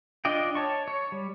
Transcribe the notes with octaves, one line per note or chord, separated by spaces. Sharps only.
D4 F4 D5 D#5 G5
C#5 A5 C#6
C#5
G3